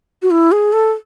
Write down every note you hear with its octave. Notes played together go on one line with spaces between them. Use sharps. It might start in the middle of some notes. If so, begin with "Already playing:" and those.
F#4
E4
G#4
A4